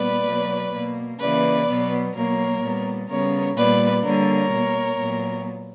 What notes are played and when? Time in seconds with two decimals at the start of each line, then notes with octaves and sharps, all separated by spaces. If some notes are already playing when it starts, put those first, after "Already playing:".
Already playing: A#2 G3 B3 B4 D5
0.26 B2 F#3 A#3
0.72 B2 A#3
1.20 C#3 E3 A#3 B4 D5
1.68 B2 F#3 B3
2.14 B2 F#3 A#3 A#4 C#5
2.62 A#2 G3 B3
3.09 C#3 G3 B3 A#4 C#5
3.56 A#2 G3 B3 B4 D5
4.04 D3 G3 A#3 A#4 C#5
4.52 B2 A#3
4.99 A#2 F#3 B3